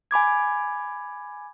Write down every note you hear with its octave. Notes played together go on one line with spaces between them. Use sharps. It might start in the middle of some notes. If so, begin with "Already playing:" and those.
G#5 B5 D6 G#6